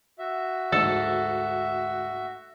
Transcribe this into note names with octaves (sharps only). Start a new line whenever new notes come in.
F#4 E5
D2 G#2 A4